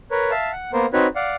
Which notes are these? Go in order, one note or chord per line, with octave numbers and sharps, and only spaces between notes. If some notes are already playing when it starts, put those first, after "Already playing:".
A#4 B4 C#5
E5 F5 A5
F#5
A#3 B3 A#4 C5
C4 D#4 F#4 B4 C#5
D5 F5 F#5